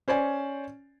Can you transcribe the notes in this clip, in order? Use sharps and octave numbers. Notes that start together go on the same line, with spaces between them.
C#4 C5 D5 G#5